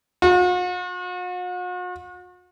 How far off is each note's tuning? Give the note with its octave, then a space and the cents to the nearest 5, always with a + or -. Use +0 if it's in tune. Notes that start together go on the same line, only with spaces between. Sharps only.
F#4 -45